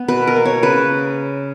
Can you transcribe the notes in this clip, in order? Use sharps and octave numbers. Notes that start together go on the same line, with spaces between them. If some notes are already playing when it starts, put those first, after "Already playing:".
Already playing: B3
B2 B4
A#4
A#3
C#5
C#3 B4